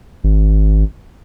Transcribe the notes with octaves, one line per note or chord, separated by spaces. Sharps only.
G#1